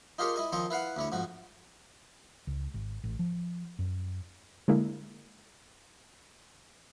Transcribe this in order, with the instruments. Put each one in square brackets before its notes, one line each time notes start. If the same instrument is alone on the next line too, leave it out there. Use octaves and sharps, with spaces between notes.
[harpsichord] D#4 F4 G4 G#4 A#4 C#5
E4 D#5 G#5
D#3 F3 C4 C#5 D#5
E4 B4 F5 F#5
D2 E4 C#5
F2 G#2 F#4
[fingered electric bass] C#2
G#1
A1
F3
F#2
[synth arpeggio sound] D3 G#3 A#3 E4